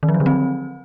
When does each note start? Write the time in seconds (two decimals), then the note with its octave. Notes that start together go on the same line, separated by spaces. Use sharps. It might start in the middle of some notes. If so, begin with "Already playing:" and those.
0.03 D#3
0.09 F3
0.14 F#3
0.20 D3
0.26 C4